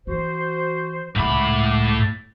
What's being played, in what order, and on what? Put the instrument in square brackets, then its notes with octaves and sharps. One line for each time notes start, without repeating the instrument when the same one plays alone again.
[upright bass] E3 [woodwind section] F#4 C5
[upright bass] C#2 G#3 [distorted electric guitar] A2 B5 [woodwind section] E5 F#5 D6